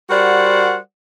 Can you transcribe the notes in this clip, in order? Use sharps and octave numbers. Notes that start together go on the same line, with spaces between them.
G3 F#4 A#4 C5 D5 F#5